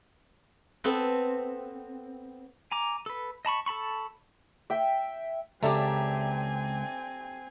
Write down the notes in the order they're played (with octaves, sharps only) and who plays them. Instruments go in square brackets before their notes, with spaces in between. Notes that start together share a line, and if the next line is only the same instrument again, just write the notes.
[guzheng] B3 C4 A4 B4
[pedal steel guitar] G#5 A#5 D6
A4 B4
D#5 A5 B5 C#6
A4 A5 B5 C#6
[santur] E5 G5
[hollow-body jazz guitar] C#2 [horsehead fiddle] C4 G#5 [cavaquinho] G4 A4 [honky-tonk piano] D5 E5 A#5